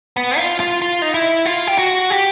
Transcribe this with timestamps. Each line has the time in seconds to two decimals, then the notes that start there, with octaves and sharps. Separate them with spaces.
0.16 B3
0.38 F4
0.60 F4
0.82 F4
1.02 D#4
1.14 E4
1.45 F4
1.67 G4
1.78 F#4
2.10 G4